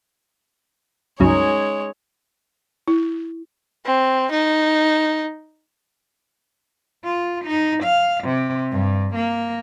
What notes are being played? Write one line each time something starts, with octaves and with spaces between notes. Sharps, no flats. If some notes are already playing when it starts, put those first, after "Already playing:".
C#2 G2 F#3 G#3 C#4 D#4 C#5
E4
C4
D#4
F4
D#4
F5
C3
G2
A#3